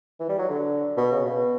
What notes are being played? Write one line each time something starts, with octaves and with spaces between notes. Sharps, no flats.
E3
G3
F#3
D3
B2
C#3
B2